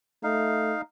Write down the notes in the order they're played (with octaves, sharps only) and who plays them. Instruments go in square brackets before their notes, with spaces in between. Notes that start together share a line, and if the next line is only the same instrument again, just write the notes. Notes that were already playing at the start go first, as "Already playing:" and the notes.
[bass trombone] A3 [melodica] D#4 F5